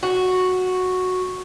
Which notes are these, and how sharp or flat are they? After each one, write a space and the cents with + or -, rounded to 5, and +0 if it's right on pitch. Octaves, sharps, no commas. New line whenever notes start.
F#4 -5